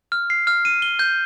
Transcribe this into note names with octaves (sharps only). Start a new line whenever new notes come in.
F6
C7
F6
D#7
G7
G6